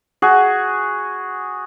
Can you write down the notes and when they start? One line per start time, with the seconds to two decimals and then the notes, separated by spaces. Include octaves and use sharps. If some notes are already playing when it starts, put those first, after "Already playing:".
0.22 F#4 G#4